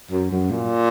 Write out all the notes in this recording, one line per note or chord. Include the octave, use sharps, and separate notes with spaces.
F#2
F#2
A#2